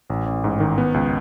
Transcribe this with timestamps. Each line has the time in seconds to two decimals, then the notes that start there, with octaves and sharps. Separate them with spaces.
0.10 A1
0.26 A1
0.44 G#2
0.60 D#3
0.78 B3
0.94 C#2